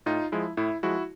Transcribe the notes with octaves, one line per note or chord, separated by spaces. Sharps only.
A2 D#4 F4
F3 G#3 E4
A2 E4
F3 G#3 E4 F#4